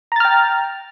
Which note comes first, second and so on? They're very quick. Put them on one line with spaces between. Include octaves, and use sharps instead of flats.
A#5 A6 F6 G5